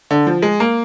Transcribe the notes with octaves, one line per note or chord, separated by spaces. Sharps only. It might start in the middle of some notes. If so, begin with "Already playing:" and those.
D3
F3
G#3
A#3